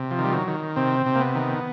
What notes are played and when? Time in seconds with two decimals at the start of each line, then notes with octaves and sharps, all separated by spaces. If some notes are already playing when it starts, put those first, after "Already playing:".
Already playing: C3
0.11 F3
0.19 D#3
0.24 G3
0.33 F#3
0.47 D#3
0.76 C3 C4
1.06 C3
1.15 A#3
1.20 B3
1.35 D#3